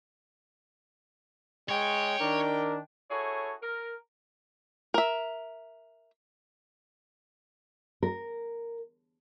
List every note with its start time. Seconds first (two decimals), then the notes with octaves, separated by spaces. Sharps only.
1.69 G#3 C#5 G5
2.20 D#3 D4 A#4
3.11 E4 F#4 G#4 A4 C#5
3.63 A#4
4.94 A#4 E5
8.03 A#4